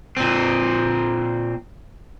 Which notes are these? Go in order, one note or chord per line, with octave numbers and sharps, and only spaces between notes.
A#2 C4